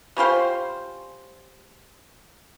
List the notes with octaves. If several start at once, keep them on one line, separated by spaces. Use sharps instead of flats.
G3 C#4 F4 C5